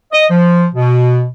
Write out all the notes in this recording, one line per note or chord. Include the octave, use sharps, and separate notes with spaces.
D#5
F3
B2